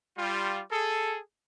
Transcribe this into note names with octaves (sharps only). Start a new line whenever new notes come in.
G3 F4
G#4 A4